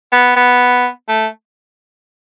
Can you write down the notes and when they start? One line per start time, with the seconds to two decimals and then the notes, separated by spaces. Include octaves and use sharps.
0.12 B3
0.36 B3
1.09 A3